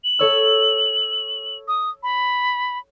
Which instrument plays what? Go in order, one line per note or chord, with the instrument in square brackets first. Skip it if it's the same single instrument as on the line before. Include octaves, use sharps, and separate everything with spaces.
[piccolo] F#7
[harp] A4 C#5 E6
[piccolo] D#6
B5